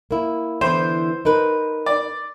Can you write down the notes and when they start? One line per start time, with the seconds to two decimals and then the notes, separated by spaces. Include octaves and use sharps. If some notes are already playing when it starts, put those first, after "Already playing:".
0.11 A#3 E4
0.61 D3 E3 B3 C5
1.25 D#4 A#4 B4
1.86 D5